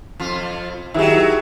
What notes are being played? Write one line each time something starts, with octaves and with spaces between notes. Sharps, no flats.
F2 F4
D#3 F#3 E4 G4 G#4